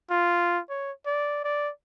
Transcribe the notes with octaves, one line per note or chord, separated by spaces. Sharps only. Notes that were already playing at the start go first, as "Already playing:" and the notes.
F4
C#5
D5
D5